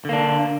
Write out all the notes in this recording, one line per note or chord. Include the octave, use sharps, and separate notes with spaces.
D3 A#3 D4